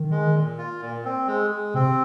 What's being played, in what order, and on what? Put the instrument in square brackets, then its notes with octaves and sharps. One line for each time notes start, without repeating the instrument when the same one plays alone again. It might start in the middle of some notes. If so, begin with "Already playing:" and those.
Already playing: [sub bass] D#3
[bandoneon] G#3
A#2
F4
A#2
C4
G#3
G#3
[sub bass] C3 [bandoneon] C4